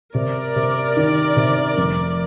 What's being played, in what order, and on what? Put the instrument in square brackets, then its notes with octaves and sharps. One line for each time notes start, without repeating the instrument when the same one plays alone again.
[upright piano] C3 [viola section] A#4 D5
[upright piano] C3
D#3
C3
F1